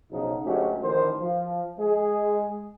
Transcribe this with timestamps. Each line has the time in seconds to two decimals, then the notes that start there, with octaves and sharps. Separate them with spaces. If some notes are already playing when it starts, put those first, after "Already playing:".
0.11 B1 C#3 F3 F#3 D#4
0.44 D2 F#3 G#3 A3 C#4 G4
0.83 A1 D#3 F3 A#4 C5
1.20 F3
1.79 G#3 G#4